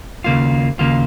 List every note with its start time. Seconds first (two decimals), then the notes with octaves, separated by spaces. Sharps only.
0.24 D#2 C#3 A#3 F4
0.79 D#2 C#3 A#3 F4